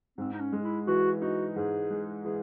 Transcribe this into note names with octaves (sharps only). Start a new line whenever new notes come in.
G#2 C4
D#4
C#4
G#3
E4
E3 F#4
D#4 F#4
G#2 G#4
G#3
E3 G#4